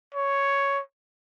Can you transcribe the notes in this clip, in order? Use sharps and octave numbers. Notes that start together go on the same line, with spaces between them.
C#5